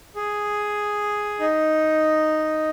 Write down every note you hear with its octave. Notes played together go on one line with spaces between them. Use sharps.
G#4
D#4